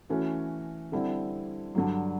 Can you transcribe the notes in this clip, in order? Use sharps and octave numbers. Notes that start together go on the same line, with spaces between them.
E3 A3 C#4 F#4
D3 G3 C4 E4
G2 D3 F#3